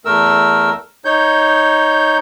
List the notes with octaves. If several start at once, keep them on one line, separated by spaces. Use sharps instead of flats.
E2 A3 A#4 E6
D#4 C#5 G6